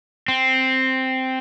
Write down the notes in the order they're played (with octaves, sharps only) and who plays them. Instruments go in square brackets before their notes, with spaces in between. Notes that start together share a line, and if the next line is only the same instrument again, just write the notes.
[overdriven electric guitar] C4